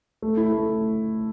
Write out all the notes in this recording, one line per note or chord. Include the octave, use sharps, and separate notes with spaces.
A3
E4
A3